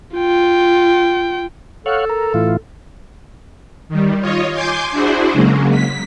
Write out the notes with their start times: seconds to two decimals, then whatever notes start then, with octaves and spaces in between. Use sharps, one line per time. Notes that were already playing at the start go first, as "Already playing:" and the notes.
0.16 F4 G5
1.86 A4 C#5 F5 F#5
2.10 A#4
2.34 A2 E3 F4
3.89 D#3 G3
4.20 F4 C#5 D#5
4.54 G#5 C6 D6 G6
4.91 D4 E4 F#4 G#4 C5
5.33 C#3 F#3 G#3 A#3
5.71 B6